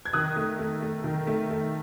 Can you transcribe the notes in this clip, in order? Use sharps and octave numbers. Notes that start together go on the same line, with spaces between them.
G#6
D#3 D#6 F#6
A3
A3
A3
D#3
A3
A3